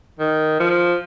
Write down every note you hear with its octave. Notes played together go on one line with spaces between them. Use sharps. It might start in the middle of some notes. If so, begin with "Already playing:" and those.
D#3
F3